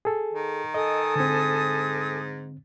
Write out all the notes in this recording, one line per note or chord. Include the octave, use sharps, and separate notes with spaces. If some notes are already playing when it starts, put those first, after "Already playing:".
G#4 A4
D#3
A4 D#5 G#5 D#6
G#2 D3 C4